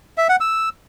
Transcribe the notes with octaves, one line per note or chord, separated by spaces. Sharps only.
E5
F#5
E6